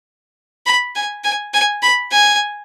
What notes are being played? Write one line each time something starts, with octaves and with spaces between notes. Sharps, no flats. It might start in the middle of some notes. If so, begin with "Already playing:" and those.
B5
G#5
G#5
G#5
B5
G#5